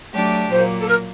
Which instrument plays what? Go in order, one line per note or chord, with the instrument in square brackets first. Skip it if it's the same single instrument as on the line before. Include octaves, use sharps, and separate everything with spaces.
[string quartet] F#3 A3 D4 G4
[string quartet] A#2 F#3 A#3 [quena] C5
[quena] A4
A#4